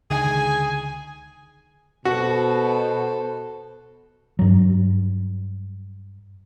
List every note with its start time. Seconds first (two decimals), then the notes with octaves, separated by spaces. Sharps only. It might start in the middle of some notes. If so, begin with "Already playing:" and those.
0.11 C#2 D3 D#3 G#4 G#5
2.05 B2 F#4 A4 C5
4.39 G2 F#3